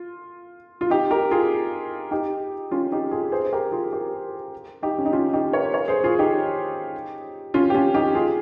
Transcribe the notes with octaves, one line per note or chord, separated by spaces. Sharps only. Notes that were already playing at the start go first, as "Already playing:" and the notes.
Already playing: F4
F4
D#4 G4
G4 A#4
F4 G#4
D#4 G4
C#4 F4
D#4 G4
F4 G#4
G#4 C5
C5
G4 A#4
F4 G#4
G4 A#4
D#4 G4
C#4
D#4
C#4 F4
D#4 G4
A#4 C#5
A#4 C#5
G#4 C5
F4 G#4
D#4 G4
C#4 F4
G4
C#4 F4
D#4 G4
F4 G#4